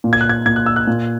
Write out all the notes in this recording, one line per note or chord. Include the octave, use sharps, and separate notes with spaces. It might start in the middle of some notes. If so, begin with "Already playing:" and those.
A#2
G#6
F#6
G#6
A#2 G#6
F#6
E6
F#6
A#2